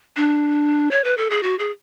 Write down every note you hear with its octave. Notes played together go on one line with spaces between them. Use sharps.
D4
C#5
B4
A4
G#4
F#4
G#4